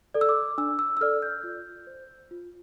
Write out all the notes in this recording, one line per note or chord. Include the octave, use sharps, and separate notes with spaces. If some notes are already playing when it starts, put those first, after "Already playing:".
A4 D5
E6
D6
D4 E6
E6
E6
A4 D5 F6
G6
F4
C5
F4